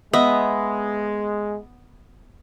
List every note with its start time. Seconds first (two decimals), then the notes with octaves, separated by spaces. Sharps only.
0.13 G#3 B3 D#5 E5